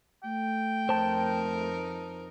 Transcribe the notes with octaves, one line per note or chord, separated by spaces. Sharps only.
A3 G5
F2 D#4 A#4 C5 A5